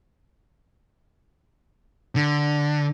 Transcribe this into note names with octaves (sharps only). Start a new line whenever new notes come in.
D3